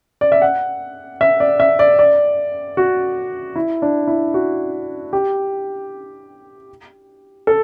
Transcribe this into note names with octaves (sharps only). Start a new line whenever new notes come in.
D5
E5
F#5
E5
D5
E5
D5
D5
F#4
E4
D4
E4
F#4
G4
A4